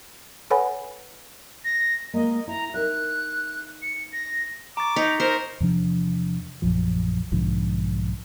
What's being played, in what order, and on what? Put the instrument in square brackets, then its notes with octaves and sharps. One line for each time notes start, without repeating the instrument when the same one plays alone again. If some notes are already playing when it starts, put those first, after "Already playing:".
[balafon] A4 B4 C#5 F#5 G#5 B5
[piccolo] A#6
[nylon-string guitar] G#3 A#3 [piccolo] D#5
[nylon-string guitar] E4 [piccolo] A#5
[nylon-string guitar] D#4 A#4 E5 [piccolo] F#6
[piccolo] C#7
A#6
[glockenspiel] A#5 C#6 A6 [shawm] D6
[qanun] D#4 [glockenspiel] B6 C#7 F7
[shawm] A#4 [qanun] C5
[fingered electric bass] E2 C3 F3 D4
A#1 F#2 F3
B1 G#2 D3 F3